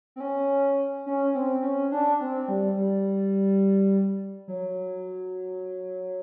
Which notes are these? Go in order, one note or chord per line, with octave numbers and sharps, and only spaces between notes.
C4
C#4
C#4
C4
C#4
D4
C4
G3
G3
F#3